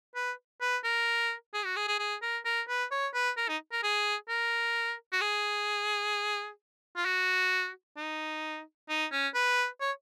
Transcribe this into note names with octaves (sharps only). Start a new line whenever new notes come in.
B4
B4
A#4
G#4
F#4
G#4
G#4
G#4
A#4
A#4
B4
C#5
B4
A#4
D#4
A#4
G#4
A#4
F#4
G#4
F4
F#4
D#4
D#4
C#4
B4
C#5